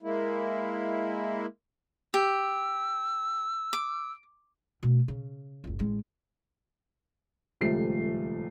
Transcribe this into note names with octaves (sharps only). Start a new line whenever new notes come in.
G#3 A#3 E4
G4 E6
D6
B2 A3
C#3
F#1 C#2
A1 G#3
D#1 C#2 F3 G3 A3 C7